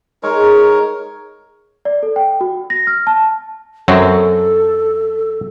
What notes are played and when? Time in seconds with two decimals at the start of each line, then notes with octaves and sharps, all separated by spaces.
0.23 G#3 D#4 A#4 C#5
1.85 D5
2.03 A4
2.16 G5
2.41 F#4
2.70 A#6
2.87 F6
3.07 A5
3.88 F#2 F#3 C4 A4